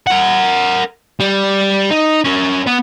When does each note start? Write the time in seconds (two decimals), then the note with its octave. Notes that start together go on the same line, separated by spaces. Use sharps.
0.07 A#4 F#5
1.20 G3
1.90 D#4
2.24 C#4 A#4
2.66 B3